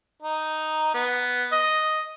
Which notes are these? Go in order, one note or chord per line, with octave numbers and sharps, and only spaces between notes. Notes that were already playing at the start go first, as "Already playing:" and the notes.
D#4
B3
D#5